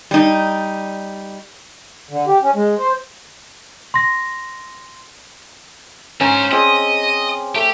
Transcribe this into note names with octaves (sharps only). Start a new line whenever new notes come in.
G3 D#4
D3
G4
C#4
G#3
C5
C6 A#6
G#2 C#4 C5 A#5
C4 G#4 D5 D#5
A3 G4